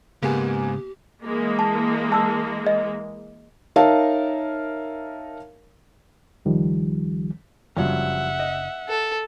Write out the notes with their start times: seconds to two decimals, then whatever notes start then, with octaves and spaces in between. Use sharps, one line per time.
0.23 G#2 C#3 A#3 B3 G4 G#5
1.24 E3 G#3 A#3
1.59 A5
2.12 A5 E6
2.67 D#5
3.76 D#4 A#4 C#5 E5 F5 A5
6.45 C#2 D#3 F3 G3
7.77 F#1 G2 C#3 F3 F#3 E5 F#5
8.39 D#5
8.89 A4